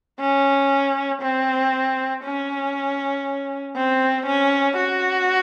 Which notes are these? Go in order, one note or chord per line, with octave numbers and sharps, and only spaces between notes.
C#4
C4
C#4
C4
C#4
F#4